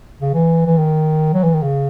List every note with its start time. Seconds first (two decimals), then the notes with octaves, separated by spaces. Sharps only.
0.21 C#3
0.34 E3
0.66 E3
0.77 D#3
1.34 F#3
1.43 E3
1.54 D#3
1.63 C#3